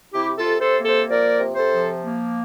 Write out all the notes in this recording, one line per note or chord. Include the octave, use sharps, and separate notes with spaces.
C3 E4 G4
F4 A4
C3
A4 C5
A#3
A4 C5
F3 A#4 D5
C3
A4 C5
F3
A#3